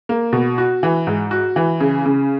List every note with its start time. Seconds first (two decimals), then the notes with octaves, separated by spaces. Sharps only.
0.09 A#3
0.33 B2
0.58 F#4
0.83 E3
1.07 G#2
1.31 F#4
1.56 E3
1.80 C#3
2.06 C#3